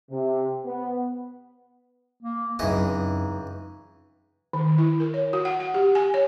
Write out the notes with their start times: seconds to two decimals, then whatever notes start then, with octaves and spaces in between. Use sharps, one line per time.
0.11 C3
0.65 B3
2.22 A#3
2.59 C#2 F#2 E3 C4 D#4 D#5
4.53 D#3
4.78 E4
5.00 A#4
5.14 C#5
5.33 F#4
5.45 F#5
5.60 F#5
5.74 G4
5.95 G#5
6.14 C#5